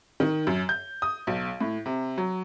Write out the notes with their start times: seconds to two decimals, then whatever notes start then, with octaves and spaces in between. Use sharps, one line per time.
0.20 D#3
0.47 F#2
0.69 G6
1.02 D#6
1.27 B1
1.61 A2
1.86 C3
2.18 F#3